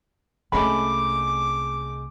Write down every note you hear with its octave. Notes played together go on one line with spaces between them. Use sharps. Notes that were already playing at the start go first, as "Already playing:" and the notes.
C2 C3 G#3 A3 C#4 B5 D6